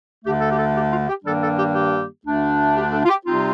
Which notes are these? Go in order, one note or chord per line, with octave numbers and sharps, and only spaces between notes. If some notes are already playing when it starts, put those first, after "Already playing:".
D2 D3 A3 D4 G4
A4
G4
A4
G4
F4
G4
G2 D#3 G3 A#3 D4 A4
A4
G4
G4
D2 D3 A3 D4
G4
A4
F4
G4
C3 G3 C4 D#4 F4